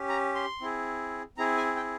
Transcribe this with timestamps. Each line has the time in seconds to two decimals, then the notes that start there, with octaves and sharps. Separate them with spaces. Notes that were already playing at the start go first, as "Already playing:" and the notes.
Already playing: C#4 G4
0.09 A#5
0.35 C6
0.61 C4 E4 G#4
1.38 C4 E4 G#4 A#5
1.57 G#5
1.76 G5